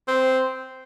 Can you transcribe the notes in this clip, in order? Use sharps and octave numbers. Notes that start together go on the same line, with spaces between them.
C4